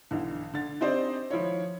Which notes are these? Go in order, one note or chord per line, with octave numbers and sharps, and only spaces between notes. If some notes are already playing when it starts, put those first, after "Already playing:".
B1 D3 E3
D3 A6
C4 D4 D#4 G4 C5 D5
D#3 F3 E4 C#5